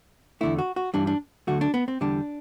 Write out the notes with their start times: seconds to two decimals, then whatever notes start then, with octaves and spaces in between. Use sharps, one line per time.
0.41 E2 D3 A3 E4
0.58 F#4
0.76 F#4
0.94 G2 E3 G3 D4
1.07 D4
1.47 D2 D3 F#3 A3 F#4
1.61 D4
1.74 B3
1.88 C4
2.01 E2 D3 G3 D4